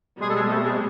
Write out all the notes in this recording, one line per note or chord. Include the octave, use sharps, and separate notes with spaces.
B2 G3 G#3 C4 G#4
A4
G#3 G#4
A3 A4
G#3 G#4